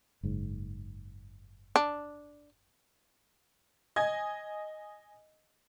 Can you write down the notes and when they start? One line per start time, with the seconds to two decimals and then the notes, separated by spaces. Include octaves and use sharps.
0.23 F#1 G#2
1.76 D4
3.96 D#5 G#5 G#6